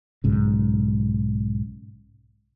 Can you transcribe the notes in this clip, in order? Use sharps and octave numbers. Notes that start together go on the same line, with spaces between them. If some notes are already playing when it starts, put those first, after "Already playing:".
B1 G#2 C#3